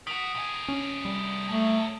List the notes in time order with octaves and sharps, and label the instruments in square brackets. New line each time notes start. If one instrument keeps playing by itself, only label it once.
[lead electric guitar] D#3 F#4 [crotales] D#6 B6 D7
[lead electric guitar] C3 G#4
[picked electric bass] C#4
G3
[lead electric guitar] A2 F#3 [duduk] A3